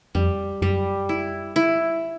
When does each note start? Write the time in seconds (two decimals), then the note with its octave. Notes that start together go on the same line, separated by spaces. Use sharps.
0.15 F2 G3
0.62 F#2 G3
1.09 E4
1.56 E4